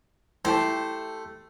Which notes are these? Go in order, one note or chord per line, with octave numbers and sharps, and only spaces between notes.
A3 E4 G4 C5 A5